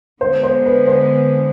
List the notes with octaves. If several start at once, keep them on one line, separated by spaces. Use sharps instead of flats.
D3 G#3 B3 C5
C5
B4
C5